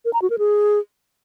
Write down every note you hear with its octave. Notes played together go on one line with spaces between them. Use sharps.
A#4
A#5
F#4
A#4
G#4